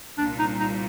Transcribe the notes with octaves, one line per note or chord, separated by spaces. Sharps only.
C2 A#2 G3 D4
D#4
D#4